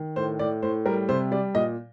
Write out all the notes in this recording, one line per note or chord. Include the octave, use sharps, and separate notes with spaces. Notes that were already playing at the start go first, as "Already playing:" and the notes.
Already playing: D#3
A2 C5
A2 D5
A2 C5
G3 A#4
C3 C5
G3 D5
A#2 D#5